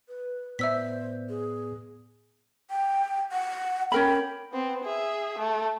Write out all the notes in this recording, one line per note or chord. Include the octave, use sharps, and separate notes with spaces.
B4
A2 B3 C5 D5 E5 E6 B6
G#4
G5
F#5
C#4 A#4 G5 B5
B3 C4
G#4 E5
A3